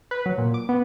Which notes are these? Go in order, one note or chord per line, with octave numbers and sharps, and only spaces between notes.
B4
F#3
A#2
D6
B3